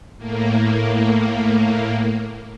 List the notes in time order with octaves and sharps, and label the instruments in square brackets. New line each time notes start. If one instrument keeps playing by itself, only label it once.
[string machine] A2 A#3